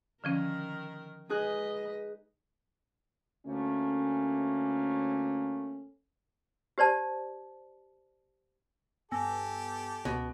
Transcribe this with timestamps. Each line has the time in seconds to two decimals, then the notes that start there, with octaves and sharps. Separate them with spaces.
0.24 D3 D#3 F3 C#4 A#4
1.29 G#3 D#4 G#4 B4 D#5 F#6
3.46 D2 A3 A#3 C#4
6.78 G4 C5 D5 A5
9.12 G2 B3 G4 A4 G#5 E6 A#6
10.05 G#1 C#2 B2